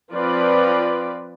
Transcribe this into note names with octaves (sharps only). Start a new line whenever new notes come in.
F3 C4 F4 B4 D5